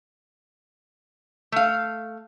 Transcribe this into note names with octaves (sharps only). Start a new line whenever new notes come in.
A3 F5